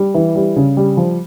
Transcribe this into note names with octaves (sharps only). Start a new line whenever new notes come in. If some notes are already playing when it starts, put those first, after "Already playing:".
Already playing: G3
E3
G3
C#3
G3
F3